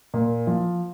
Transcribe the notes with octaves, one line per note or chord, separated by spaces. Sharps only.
A#2
F3